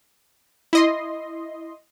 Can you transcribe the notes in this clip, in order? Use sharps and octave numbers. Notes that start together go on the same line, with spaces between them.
E4 D#5 C6